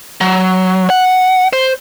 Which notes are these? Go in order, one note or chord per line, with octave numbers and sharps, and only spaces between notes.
F#3
F#5
C5